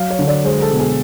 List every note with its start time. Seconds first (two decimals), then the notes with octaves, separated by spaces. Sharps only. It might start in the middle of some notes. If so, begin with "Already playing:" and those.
Already playing: F#3 F5
0.10 C#5
0.19 D3
0.28 D5
0.45 G#3 C5
0.62 A4
0.71 B2
0.80 G#4